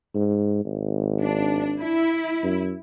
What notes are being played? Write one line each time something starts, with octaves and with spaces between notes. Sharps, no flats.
G#2
G#1
D4
E4
F#2